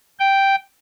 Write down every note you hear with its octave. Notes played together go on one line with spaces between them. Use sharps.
G5